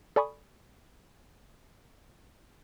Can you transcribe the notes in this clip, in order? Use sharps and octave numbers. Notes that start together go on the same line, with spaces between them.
A4 D5 G#5 B5 C#6 D#6